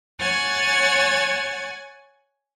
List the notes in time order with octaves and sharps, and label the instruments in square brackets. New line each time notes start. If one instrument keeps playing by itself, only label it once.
[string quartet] C#5 F#5 G#5 G#6 A6